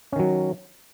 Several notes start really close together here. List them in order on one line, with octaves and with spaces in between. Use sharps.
C#4 D#3 F#3